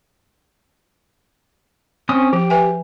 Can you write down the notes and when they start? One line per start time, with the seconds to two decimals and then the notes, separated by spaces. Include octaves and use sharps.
2.09 C4 C#4 D#6
2.33 F3 G4
2.50 B4 E5 G#5